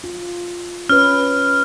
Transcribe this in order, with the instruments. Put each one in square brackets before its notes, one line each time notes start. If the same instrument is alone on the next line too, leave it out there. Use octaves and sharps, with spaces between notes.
[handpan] F4
[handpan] C#4 B4 [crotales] F6